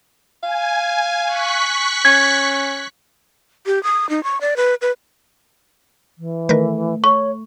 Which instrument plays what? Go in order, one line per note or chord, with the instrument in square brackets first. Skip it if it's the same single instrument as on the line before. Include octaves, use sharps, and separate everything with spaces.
[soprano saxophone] F5 [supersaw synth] G#5
[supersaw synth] C#6 F#6 B6
[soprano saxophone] C#4 [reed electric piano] G#6
[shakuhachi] G4
D#6
D#4
C#6
D5
B4
B4
[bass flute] E3
[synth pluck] D#3 A#4 B4 [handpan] A3
[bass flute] C#5 [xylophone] C#6